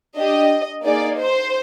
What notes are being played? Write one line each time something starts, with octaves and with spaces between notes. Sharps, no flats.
D4 G4 D#5
A#3 D#4 G#4 D5
C5